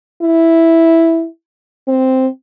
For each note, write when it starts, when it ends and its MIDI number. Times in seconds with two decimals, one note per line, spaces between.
0.22 1.26 64
1.88 2.28 60